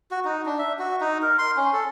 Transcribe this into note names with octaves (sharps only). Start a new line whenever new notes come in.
F#4
D#4
D4
E5
F#4
D#4
A#4
C6
C#4
A4